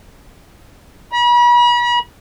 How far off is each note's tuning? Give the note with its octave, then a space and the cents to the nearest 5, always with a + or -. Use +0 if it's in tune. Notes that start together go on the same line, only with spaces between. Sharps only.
B5 -40